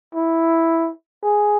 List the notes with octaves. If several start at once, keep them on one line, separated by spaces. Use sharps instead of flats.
E4
G#4